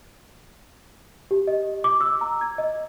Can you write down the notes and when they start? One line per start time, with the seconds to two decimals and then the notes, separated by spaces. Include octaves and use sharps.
1.31 G4
1.47 D#5
1.84 D6
2.01 E6
2.21 A#5
2.41 G#6
2.58 D#5